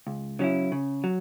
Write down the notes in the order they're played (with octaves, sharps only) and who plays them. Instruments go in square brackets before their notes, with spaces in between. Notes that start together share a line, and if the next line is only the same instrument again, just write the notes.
[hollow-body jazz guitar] C#2
C#3 F#3 C#4 E4
C#3
F#3